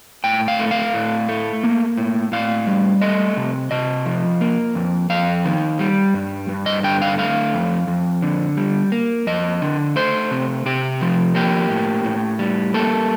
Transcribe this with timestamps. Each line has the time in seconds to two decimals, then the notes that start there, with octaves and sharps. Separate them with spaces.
0.24 A2 G5
0.48 F5
0.59 A3
0.71 F5
0.94 A2
1.29 A3
1.63 A#3
1.97 A2
2.32 A2 F5
2.67 G3
3.02 A3 D#5
3.37 C3
3.71 C3 D#5
4.06 F3
4.41 A#3
4.75 F2
5.10 F2 F5
5.45 D#3
5.79 G3
6.14 G2
6.49 G2
6.66 D#5
6.83 D3 G5
7.02 F5
7.18 A3 F5
7.54 F2
7.87 F2
8.22 D3
8.57 G3
8.92 A#3
9.27 F2 D#5
9.62 D3
9.96 A3 C5
10.31 C3
10.66 C3 G4
11.01 F3
11.35 A#3 G4
11.70 A2
12.04 A2
12.39 G3
12.74 A#3 A4